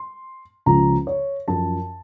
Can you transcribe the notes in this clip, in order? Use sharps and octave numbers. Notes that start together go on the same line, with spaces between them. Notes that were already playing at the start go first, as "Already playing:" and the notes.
Already playing: C6
C#2 C#3 F3 A#5
C#5
F#2 F3 A5